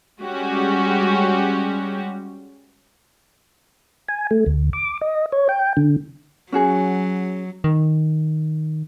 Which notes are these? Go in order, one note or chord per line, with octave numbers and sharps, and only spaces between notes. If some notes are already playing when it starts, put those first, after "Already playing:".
G3 G#3 C#4 F#4 G4
G#5
A3
D2
D6
D#5
C#5
G5
D3
F#3 C#4 F#4 G#4
D#3